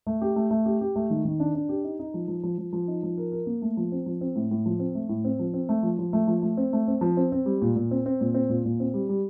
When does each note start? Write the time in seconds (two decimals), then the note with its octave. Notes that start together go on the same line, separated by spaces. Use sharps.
0.07 A3
0.21 G4
0.36 A3
0.51 A3
0.66 G4
0.81 G4
0.96 A3
1.10 D#3
1.25 D#3
1.40 D4
1.55 D4
1.69 G4
1.84 D#4
1.99 D#4
2.14 F3
2.28 F3
2.44 F3
2.58 F3
2.73 F3
2.88 D#4
3.03 F3
3.18 A#4
3.32 A#4
3.46 A#3
3.62 A3
3.77 F3
3.92 C4
4.06 F3
4.21 C4
4.35 A2
4.51 A2
4.66 F3
4.79 C4
4.95 A3
5.09 A2
5.24 C4
5.39 F3
5.54 C4
5.69 A3
5.83 F3
5.99 F3
6.13 A3
6.27 F3
6.42 A3
6.57 C4
6.73 A3
6.88 C4
7.01 F3
7.17 C4
7.32 C4
7.46 G3
7.62 A#2
7.76 A#2
7.91 C4
8.06 C4
8.21 A#2
8.34 C4
8.49 A#2
8.65 A#2
8.80 C4
8.94 G3
9.09 G3